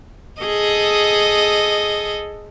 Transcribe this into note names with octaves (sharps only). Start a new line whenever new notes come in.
G#4 A4 D#5